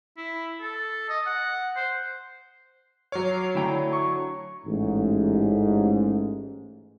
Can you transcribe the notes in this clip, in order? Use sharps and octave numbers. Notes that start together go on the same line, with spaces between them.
E4
A4
D#5
F#5
C5
F#3 C#5 D6 F6 C7
D3 A3 E4 G5 A#5
C#6
A1 G#2